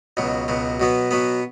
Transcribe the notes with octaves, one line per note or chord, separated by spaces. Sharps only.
C#2 B2 F#3
C#2 B2 F#3
B2 F#3 B3
B2 F#3 B3